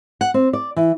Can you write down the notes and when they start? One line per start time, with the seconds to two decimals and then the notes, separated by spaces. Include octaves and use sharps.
0.21 F#5
0.34 C4
0.53 D5
0.76 E3